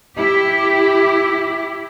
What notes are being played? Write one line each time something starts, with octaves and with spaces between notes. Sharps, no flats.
E4 G4